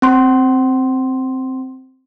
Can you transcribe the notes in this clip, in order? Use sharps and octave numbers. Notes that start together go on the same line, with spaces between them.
C4 C6